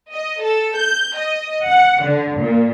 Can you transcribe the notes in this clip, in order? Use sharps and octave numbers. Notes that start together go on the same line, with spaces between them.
D#5
A4
G6
D#5
F#5
D3
A#2